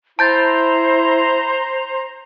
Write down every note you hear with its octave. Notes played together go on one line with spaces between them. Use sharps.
E4 C5 A5 A#5 G6 A6